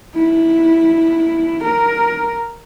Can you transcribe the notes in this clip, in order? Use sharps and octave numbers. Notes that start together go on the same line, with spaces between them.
E4
A#4